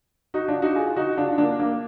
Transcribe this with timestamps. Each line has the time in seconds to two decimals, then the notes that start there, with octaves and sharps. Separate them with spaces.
0.34 D#4 F#4
0.48 D4 F4
0.62 D#4 F#4
0.75 F4 G#4
0.96 D#4 F#4
1.17 D4 F4
1.38 A#3 D4
1.59 A#3